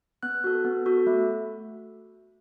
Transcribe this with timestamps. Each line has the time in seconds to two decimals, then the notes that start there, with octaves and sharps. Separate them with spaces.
0.23 B3 F#6
0.44 F#4 A4
0.65 B3
0.86 F#4 A4
1.07 A3